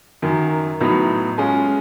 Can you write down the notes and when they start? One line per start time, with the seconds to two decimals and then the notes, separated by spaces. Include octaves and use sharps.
0.22 F#2 D#3 F#3
0.81 A2 F#3 B3 D#4
1.38 G#3 C#4 F4